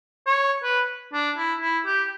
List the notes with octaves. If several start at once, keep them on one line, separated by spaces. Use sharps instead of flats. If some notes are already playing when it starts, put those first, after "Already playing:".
C#5
B4
D4
E4
E4
G4